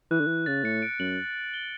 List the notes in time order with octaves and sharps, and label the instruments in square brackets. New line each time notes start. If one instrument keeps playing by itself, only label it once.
[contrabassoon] E3 [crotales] F#6
[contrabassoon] D3
E3
[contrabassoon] C#3 [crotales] A6
[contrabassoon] A2 [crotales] C#7
[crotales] D7
[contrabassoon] F#2 [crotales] F#7
[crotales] G7